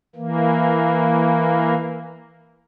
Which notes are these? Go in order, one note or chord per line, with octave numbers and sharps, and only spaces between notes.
E3 A#3